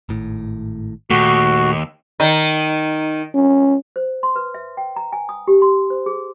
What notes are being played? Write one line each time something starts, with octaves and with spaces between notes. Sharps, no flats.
G#1 A2
D#2 A#2 A3 F#4
D#3 D#4
C#4
C5
C6
B4
E5
G5
A#5
G#5
D#6
G4
C6
C5
G#4